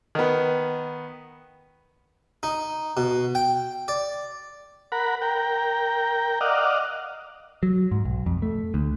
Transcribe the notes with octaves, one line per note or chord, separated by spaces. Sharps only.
D#3 B3
D#4
B2
G5
D5
A#4 F#5 B5
A#4 G5
D5 D#5 F5 F#5
F#3
G#2
B1
F2
A3
D2